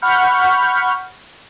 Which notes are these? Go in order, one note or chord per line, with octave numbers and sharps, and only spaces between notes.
F#5 B5 C#6 F6 G6